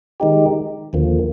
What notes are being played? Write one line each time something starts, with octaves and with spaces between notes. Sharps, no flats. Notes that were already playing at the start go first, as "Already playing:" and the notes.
D#3 G#3 D#4 G4
D#2 D3 F3 A#3